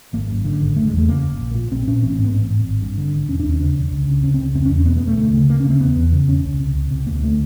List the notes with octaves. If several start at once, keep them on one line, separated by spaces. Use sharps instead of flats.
G#1 A#3
F#2
D3
G#1
F#1 A3
G#3
E2
A3
C#3 A#3
F#1
A#1
A#2
A#1 C4
A#2 C#4
A1 C4
C4
G#2
B3
A1 C4
G#2
G#1
G2
D3
G#1
E1 C#4
D4
D#2
C#4
C#3 D4
E1
C#2
C#3
C#2 C#4
C4
C#3
F1 C4
C#4
E2
C#4
B2 B3
B3
F1
A3
D2 A3
C#3
D2 A#3
C#4
C#3
C4
E1 B3
E2
C#3
E1 C#4
C#2
C3
C#2
C3
D2 A#3
D3 A3